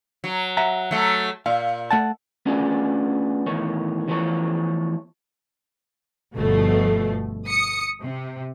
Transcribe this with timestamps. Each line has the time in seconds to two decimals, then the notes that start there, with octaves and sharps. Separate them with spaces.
0.24 F#3
0.57 E5 F#5 A#5
0.91 F#3 A3
1.46 A#2 F5
1.91 A3 F#5 A5
2.46 A3 B3 C#4 D4 F4 G#4
3.46 E2 A2 D#3 C#5
4.08 E2 E3 F3 A3 A4 C#5
6.35 G1 B2 F3 A3
7.47 D#6 C#7
8.03 C3